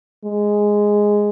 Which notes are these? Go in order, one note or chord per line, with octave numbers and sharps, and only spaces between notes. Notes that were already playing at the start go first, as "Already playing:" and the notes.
G#3